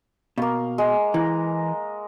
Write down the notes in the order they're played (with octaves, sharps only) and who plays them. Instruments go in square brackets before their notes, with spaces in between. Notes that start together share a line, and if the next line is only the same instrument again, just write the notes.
[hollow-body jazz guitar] B2 [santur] A#3 F5
[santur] G#3
[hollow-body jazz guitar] E3 [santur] A#5